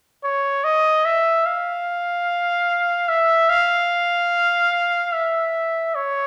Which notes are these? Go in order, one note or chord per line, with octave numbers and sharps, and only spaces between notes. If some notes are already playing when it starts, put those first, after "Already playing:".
C#5
D#5
E5
F5
E5
F5
E5
C#5